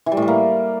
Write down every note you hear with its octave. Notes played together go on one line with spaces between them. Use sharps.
E3
G3
A2
G3
A#3